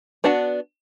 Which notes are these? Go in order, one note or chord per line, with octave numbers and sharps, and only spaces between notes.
B3 D4 F#4 F#5 A5